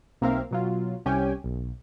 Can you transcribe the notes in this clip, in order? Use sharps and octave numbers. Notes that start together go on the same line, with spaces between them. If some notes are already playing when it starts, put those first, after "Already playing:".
B1 A#3 C4 A#4 E5 F5
B2 F#3 F4
C2 C#4 G4 G5 G#5
B1